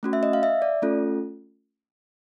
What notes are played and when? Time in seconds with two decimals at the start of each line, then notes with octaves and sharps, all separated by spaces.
0.03 A3 C#4 F#4
0.13 E5
0.23 D#5
0.33 F5
0.43 E5
0.62 D5
0.82 A3 C#4 F4 A4